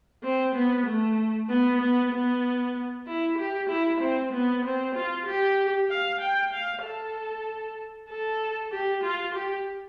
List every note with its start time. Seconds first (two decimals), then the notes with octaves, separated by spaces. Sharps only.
0.23 C4
0.55 B3
0.86 A3
1.50 B3
1.81 B3
2.13 B3
3.07 E4
3.38 G4
3.69 E4
4.00 C4
4.33 B3
4.64 C4
4.95 F4
5.26 G4
5.90 F5
6.21 G5
6.52 F5
6.83 A4
8.10 A4
8.71 G4
9.03 F4
9.34 G4